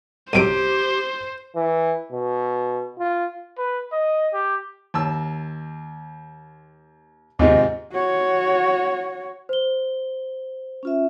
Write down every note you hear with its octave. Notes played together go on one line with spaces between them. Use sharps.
C2 F#2 C3 G4 C5 D7 D#7
E3
B2
F4
B4
D#5
G4
D#2 A5 E6
D#2 G#2 C3 F4 D#5
F#4 C#5
C5 G7
C#4 F4 E5